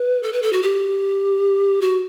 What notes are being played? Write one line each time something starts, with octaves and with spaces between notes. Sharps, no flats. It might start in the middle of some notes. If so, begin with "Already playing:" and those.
Already playing: B4
A4
B4
A4
F#4
G4
F#4